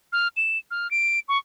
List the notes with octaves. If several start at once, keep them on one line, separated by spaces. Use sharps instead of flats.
F6
E7
F6
D7
C#6